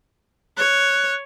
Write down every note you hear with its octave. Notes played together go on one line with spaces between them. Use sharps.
C#5 F#6